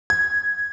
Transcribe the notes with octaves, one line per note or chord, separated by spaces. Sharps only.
G#6